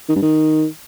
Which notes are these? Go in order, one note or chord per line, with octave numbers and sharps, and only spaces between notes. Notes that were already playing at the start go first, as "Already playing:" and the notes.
D#3
G2
D#3